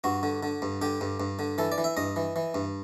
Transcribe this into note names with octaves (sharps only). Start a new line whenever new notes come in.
G2 F#4
D3
D3
G2
D3 G4
G2
G2
D3
E3 A4
D5
E3
E5
G2 D#5
E3
E3
G2